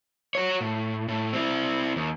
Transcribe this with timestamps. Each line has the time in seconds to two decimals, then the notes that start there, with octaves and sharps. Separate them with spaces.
0.35 F#4 C#5
0.61 A2
1.08 A2
1.33 C4 E4
1.96 D#2